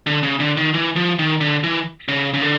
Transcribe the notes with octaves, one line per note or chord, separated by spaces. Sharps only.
D3
C#3
D3
D#3
E3
F3
D#3
D3
E3
C#3
C#3
D3